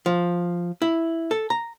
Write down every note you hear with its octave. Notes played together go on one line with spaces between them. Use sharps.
F3
E4
A4
A#5